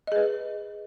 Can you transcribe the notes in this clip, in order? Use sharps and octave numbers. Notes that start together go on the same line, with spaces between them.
G#4 B4 D#5